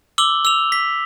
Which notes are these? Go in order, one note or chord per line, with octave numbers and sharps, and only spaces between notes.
D6 E6 F#7 G7
E6 F7
B6